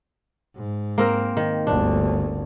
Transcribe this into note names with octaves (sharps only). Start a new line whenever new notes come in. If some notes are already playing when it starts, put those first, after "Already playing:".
G#2
A#3 C4 A#4
D#3
G1 D2 D4